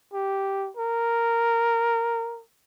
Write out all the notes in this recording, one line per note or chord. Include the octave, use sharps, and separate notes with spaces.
G4
A#4